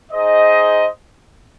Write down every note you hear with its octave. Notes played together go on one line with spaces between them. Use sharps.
D#4 G#4 C5 D#5